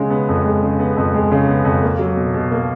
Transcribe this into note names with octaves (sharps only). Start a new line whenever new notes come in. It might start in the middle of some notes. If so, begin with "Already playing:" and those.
Already playing: C#3 G#3
B3
F2
G#3
C#3
B3
F2
G#3
C#3
B3
F2
A#3
F#3
B2
B2
A#3